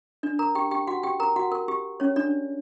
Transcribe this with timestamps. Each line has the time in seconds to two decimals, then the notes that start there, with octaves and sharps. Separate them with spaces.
0.23 D4 D5
0.39 A#4 A#5
0.55 G4 G5
0.71 G4 G5
0.87 F#4 F#5
1.03 G4 G5
1.20 A#4 A#5
1.36 F#4 F#5
1.52 A#4
1.68 G4
2.00 C#4 C#5
2.16 D4 D5